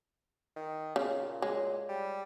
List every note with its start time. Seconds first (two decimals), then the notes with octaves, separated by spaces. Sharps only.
0.56 D#3
0.96 A#2 C#3
1.42 G#3 C#5
1.89 G3